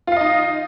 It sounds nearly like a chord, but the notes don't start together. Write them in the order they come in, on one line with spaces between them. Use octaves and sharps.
F4 F5 D#5 D#4